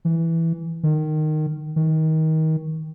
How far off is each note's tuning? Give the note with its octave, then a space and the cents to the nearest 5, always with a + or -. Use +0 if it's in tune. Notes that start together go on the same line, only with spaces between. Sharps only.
E3 +0
D#3 -15
D#3 +25